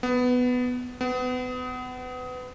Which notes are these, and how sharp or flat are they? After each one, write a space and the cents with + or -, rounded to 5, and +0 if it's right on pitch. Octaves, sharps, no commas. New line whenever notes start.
B3 +10
B3 +30